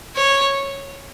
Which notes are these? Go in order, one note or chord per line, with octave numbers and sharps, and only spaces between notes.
C#5